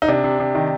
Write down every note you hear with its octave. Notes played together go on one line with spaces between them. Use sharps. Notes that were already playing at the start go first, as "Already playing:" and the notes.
D#4
C3 D4
C3
C3
D#3